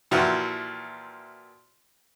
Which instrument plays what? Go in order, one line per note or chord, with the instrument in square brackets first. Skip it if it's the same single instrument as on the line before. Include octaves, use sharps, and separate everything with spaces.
[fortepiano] A#2 E3 F3 E4 F#4 G4